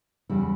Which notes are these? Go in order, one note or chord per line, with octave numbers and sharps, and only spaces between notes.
E2 C#3 G3 E4